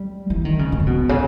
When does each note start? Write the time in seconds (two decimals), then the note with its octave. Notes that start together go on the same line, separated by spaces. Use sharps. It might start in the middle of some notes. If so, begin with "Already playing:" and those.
Already playing: G3
0.30 E3
0.45 D#3
0.59 C#3
0.72 G#2
0.80 C#3
0.87 B2
1.09 C#3